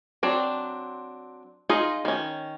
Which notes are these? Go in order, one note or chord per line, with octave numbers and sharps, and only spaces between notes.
F#3 C4 D4
D#4 F4 G#4 D#5
D#3 C#4